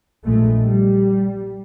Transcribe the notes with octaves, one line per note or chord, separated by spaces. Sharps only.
A#1 G#3 A3
G3